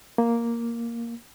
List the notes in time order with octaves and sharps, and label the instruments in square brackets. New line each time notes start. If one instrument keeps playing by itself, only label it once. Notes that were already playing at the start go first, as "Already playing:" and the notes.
[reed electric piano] A#3